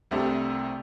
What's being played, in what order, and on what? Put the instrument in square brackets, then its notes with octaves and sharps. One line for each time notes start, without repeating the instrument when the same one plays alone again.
[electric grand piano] C2 C3 A3 [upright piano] D4 G4